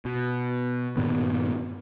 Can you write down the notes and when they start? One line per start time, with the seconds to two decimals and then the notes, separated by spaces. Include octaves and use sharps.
0.05 B2
0.97 G2 A#2 D#3 B3